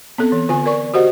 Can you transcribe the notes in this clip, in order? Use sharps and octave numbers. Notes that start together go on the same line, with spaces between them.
B3 C4 A4
E3
D3 F4 G#5
A#4 D5 C#6
F#4 G4 C5 D#5 F#5